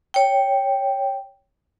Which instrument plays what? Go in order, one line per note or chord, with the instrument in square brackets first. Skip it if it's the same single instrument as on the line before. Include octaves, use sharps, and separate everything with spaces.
[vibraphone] C#5 G5